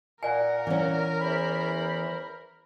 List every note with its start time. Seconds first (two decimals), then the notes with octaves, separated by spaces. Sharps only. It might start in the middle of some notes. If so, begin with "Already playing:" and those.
0.23 A#2 A#4 D5 F#5 G#5
0.67 E3 C#4
1.20 E2 C5 B5